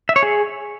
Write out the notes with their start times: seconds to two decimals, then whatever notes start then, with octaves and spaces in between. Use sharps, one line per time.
0.09 E5
0.16 C#5
0.23 G#4